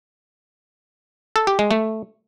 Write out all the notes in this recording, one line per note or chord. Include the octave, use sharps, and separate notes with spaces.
A4
G4
G#3
A3